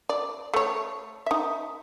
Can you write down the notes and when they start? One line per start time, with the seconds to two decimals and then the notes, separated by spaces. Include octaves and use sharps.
0.09 D5
0.54 A3 C#5
1.26 D#4 E5